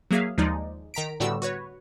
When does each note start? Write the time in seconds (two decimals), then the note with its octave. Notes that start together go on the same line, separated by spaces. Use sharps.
0.11 F#3 A#3 G#4 E5 F5
0.38 D#2 F3 G#3 D#4 D5
0.94 D#3 A#5 B6 D7
1.20 A2 D3 G3 B3 F#4 E6
1.42 F#4 B4 C#5